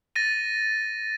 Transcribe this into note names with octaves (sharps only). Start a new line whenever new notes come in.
A6 A#6 D#7